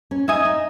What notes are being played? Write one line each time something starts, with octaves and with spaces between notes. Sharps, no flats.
C#4
D#4 E5 G#5 D#6
D#4